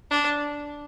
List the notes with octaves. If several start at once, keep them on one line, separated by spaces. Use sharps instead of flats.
D4